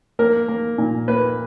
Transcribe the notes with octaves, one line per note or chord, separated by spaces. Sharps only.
A#3 A#4
A#3
A#2
A#3 B4